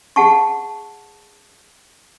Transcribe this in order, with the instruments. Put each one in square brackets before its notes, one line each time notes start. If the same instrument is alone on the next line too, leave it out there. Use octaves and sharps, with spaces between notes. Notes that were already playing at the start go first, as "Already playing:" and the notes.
[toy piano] G#4 F#5 A5 C#6